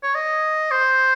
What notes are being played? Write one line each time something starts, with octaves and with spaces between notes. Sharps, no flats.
C#5
D#5
C5